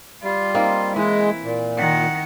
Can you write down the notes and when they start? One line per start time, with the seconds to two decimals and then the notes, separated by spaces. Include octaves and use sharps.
0.23 G3 F4
0.54 A#3 C4 D#4
0.96 E3 G#3 E4
1.44 A#2
1.77 D#3 F#5